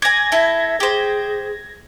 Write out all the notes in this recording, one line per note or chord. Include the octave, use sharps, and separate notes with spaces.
D5 G#5 G#6 A#6
E4 A4 E5
G4 G#4 C5